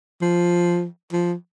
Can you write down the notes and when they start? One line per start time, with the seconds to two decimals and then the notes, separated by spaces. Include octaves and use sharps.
0.22 F3
1.13 F3